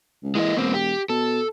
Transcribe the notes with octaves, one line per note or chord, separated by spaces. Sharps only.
C#2
E3 G#3 A#3 D#5
E1 A#3 C4
G4
B2 A4